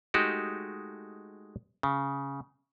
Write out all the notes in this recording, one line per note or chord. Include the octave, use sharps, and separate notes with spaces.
G#3 A3 D#4 F#4 G4
C#3